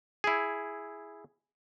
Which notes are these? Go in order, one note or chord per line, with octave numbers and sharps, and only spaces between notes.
E4 G#4